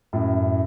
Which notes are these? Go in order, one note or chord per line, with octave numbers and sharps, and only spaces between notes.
F#2 A2